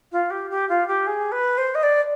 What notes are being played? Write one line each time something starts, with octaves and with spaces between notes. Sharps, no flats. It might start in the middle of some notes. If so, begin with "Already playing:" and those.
F4
G4
G4
F4
G4
G#4
B4
C5
D#5
D5